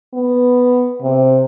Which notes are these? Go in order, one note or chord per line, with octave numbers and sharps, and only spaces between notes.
B3
C3